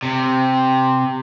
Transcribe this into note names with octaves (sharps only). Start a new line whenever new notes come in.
C3